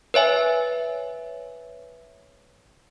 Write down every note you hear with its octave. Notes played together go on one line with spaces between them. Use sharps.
B4 C#5 E5 G#5